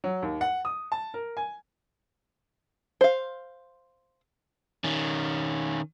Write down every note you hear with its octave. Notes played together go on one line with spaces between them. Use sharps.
F#3
D#2
F#5
D#6
A5
A#4
G#5
C5 F5
D#3 C#4